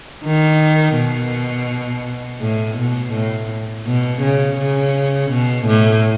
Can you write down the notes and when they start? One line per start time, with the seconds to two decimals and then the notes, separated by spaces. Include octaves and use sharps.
0.25 D#3
0.96 B2
2.41 A2
2.78 B2
3.14 A2
3.86 B2
4.22 C#3
4.58 C#3
5.31 B2
5.67 A2